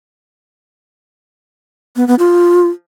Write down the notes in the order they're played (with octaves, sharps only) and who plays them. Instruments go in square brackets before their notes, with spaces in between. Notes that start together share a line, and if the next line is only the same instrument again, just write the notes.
[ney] B3
B3
F4